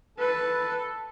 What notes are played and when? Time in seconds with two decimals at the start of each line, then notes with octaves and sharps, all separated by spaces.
0.18 A4 B4